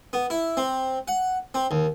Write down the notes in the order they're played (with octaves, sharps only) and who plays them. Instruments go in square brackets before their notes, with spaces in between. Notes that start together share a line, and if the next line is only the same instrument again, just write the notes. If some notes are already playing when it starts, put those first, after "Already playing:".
[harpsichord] B3
E4
C4
F#5
C4
D#2